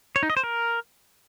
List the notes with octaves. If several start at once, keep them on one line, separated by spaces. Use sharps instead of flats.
C#5
D#4
D#5
C5
A#4